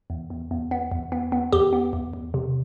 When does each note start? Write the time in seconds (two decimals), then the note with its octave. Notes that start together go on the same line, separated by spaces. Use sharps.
0.10 E2
0.30 E2
0.51 E2
0.71 B3
0.92 E2
1.12 B3
1.32 B3
1.52 E2 G4
1.73 B3
1.93 E2
2.13 E2
2.34 C3